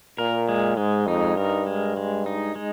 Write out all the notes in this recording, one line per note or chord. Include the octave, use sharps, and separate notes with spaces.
A#2 A#4
G#3
G#2 G#3
F2 D#4
G2 A#4
G#3
G#3
D#4
G#3